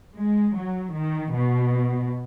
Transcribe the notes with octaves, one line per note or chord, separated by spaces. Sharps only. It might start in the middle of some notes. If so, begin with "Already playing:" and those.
G#3
F#3
D#3
B2